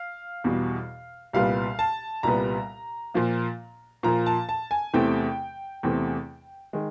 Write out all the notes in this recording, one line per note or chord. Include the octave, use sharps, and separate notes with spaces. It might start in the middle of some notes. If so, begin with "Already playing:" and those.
Already playing: F5
E2 B2 G3
C2 A#2 G3 B3 F5
A5
C2 A#2 G3 B3 A#5
A#2 F3 A#3
A#2 F3 A#3 A#5
A5
A5
G#5
E2 C3 E3 A3 C4 G5
E2 C3 E3 A3 C4
D#3 G#3